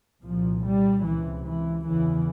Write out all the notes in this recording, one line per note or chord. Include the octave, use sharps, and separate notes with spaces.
C2 A#2 F3
G3
C#2 C3 E3
E3
E2 C#3 E3